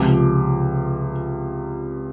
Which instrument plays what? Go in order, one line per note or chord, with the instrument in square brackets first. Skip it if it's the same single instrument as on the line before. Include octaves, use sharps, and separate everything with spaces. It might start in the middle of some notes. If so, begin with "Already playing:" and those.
Already playing: [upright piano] C#2 C3 F3 D6